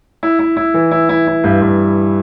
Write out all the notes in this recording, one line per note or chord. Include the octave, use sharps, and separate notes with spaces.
E4
E4
E4
E3
E4
E4
E4
G2
G2